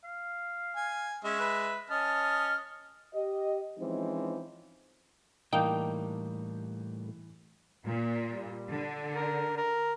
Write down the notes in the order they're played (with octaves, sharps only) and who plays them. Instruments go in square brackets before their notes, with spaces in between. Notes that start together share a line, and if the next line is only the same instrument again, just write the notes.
[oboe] F5
[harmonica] G#5
[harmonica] G#3 E5 [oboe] C#4
[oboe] B4
[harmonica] C#4 D#5 F6 [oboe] A5
[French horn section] G4 D#5
E3 F3 G#3 C4 C#4 D#4
[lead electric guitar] A2 G3 [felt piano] E3 [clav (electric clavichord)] A#3 D4 D#4 [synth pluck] G5
[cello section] A#2
[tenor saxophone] G3
[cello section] D3
[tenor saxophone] A#4
A#4